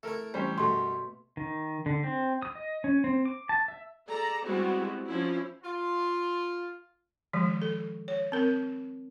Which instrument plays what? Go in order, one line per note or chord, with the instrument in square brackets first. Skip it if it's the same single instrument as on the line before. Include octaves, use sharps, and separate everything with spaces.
[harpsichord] A3 E4 [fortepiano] A4 A#4
[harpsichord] A1 [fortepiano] G3 C#4 C5
[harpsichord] F#2 [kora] B2 A3 [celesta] C6
[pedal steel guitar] D#3
D3
C4
D#6
D#5
C#4
C4
D6
A5
E5
[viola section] G#4 A4 D5 A#5
G3 G#3 B3 C4 E4 F#4
F3 C#4 D4 E4
[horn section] F4
[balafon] D#3 F3 G#3
A4
C#5
C4 A#4